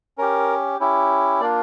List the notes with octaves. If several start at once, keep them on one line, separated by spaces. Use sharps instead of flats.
C#4 G4 A#4
C#4 E4 G4
A#3 D4 F4 D5